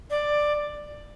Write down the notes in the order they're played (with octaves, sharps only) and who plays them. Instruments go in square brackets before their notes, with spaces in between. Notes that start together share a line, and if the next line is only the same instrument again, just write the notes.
[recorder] D5